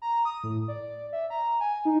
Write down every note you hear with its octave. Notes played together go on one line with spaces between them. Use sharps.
A#5
D#6
A2
D5
E5
A#5
G#5
D#4